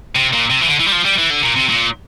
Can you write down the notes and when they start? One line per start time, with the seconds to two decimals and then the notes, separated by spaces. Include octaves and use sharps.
0.16 C3
0.33 A#2
0.50 C3
0.61 E3
0.67 D3
0.80 E3
0.86 G3
0.92 F3
1.05 G3
1.18 E3
1.31 D3
1.43 A#2
1.56 C3
1.69 A#2